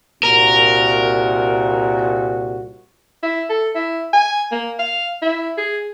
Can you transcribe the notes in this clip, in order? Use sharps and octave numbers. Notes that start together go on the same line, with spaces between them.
C2 A#2 F#4 A#4
E4
A4
E4
G#5
A#3
F5
E4
G#4